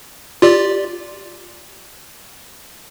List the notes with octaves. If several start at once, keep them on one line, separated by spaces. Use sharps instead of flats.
F4 G4 D5